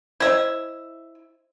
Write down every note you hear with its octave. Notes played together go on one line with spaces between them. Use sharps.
E4 C5 D#5 E5